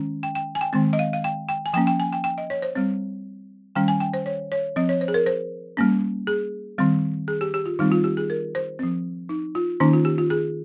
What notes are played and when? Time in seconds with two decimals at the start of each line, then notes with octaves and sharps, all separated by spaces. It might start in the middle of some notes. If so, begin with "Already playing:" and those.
Already playing: D#3 G#3 C#4
0.23 G5
0.35 G5
0.55 G#5
0.61 G5
0.73 D#3 G#3 C4
0.93 D#5
0.99 F5
1.13 F5
1.24 G5
1.49 G5
1.66 G#5
1.74 F3 A#3 C#4 G5
1.87 G5
2.00 G#5
2.12 G5
2.24 G5
2.38 D#5
2.50 C#5
2.62 C5
2.75 G3 C4
3.75 D#3 G3 C#4 G5
3.88 G#5
4.00 G5
4.13 C5
4.26 C#5
4.52 C#5
4.76 F3 C4 D#5
4.89 C#5
5.01 C5
5.08 G#4
5.14 A#4
5.26 C5
5.77 G3 A#3 C#4
6.27 G#4
6.78 D#3 G3 C4
7.28 G#4
7.41 G4
7.54 G4
7.66 F4
7.79 D#3 G3 C4 D#4
7.92 F4
8.04 G4
8.17 G#4
8.30 A#4
8.55 C5
8.79 F3 C4
9.29 D#4
9.55 F4
9.80 D#3 A#3 C#4 D#4
9.93 F4
10.05 G4
10.18 F4
10.30 G#4